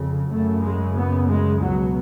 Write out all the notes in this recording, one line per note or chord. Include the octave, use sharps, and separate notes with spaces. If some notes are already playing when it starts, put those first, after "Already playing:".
Already playing: F2 C#3
F#2 C#3 A3
G#3
B3
G#3
C#2 B2 F#3